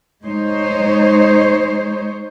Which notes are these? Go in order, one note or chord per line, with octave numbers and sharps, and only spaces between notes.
G#3 D#4 C5 C#5